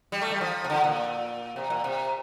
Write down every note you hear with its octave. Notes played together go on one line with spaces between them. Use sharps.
G3
A3
G3
F3
C3
D3
A#2
C3
A#2
C3